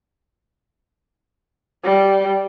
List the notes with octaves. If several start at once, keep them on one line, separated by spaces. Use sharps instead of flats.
G3